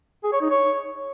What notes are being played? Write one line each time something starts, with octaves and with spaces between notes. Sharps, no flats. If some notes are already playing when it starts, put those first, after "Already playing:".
G#4
C#5
D#4
C#5